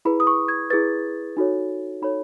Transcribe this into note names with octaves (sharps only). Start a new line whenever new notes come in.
E4 G#4 B4 B5
D#6
C#6
G#6
E4 G#4 B4 A6
D#4 F#4 A4 C#5
D#4 F#4 A4 C#5 B5